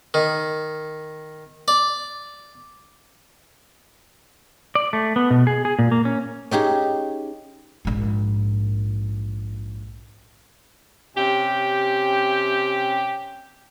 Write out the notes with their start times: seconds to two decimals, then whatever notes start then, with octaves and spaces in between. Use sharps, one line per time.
0.14 D#3
1.68 D5
4.75 D5
4.93 A3
5.16 B3
5.31 B2
5.47 G#4
5.65 G#4
5.79 A#2
5.92 A#3
6.05 C#4
6.51 C#4 D#4 G4 G#4
7.85 A#1 G#2
11.17 C3 C#4 G4 G5